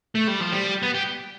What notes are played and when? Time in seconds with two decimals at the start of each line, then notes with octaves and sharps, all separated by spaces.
0.15 A3
0.28 G3
0.40 F3
0.52 G3
0.82 B3
0.95 G4